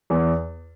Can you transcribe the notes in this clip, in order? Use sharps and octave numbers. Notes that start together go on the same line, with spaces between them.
E2